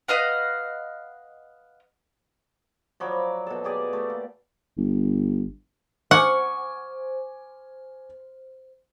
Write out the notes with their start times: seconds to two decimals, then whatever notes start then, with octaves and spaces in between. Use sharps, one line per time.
0.08 B4 D#5 F5 F#5
3.00 F3 F#3 D5 B5
3.47 B2 A4
3.64 G4 G#4 D5
3.93 A3
4.10 A#3
4.77 G1
6.11 C5 F#5 G#5 C#6 D6 F6